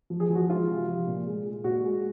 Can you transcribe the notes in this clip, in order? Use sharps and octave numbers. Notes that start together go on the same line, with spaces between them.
F3
G#4
F3
F#4
G#3 F4
C3
F3
A#2
G#3
G#3
A#2 F#4
G#3